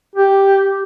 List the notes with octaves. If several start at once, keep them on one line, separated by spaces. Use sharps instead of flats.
G4